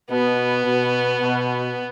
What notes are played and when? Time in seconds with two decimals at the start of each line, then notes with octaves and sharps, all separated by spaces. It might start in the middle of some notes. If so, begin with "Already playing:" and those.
0.10 B2 B3
0.65 B2
1.21 B2